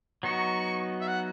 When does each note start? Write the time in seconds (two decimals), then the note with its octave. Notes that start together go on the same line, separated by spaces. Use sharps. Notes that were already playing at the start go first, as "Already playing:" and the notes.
0.23 F#3 B3 D#4 F#4 C#6
1.01 E5
1.08 F#5